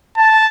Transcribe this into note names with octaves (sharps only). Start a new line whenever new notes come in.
A5